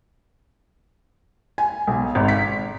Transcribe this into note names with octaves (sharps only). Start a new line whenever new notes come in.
G#5
B1
G#1
B6